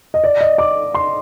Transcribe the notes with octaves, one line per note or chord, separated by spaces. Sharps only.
D#5
D5
D#5
D6
C6